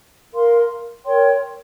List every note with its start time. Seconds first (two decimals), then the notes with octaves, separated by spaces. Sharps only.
0.34 A#4 F5 C6
1.06 A#4 C#5 G5 C6